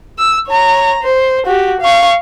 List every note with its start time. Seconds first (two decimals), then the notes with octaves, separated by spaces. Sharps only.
0.18 E6
0.48 C#5 A#5
1.03 C5
1.47 F#4 G4
1.81 F5 C#6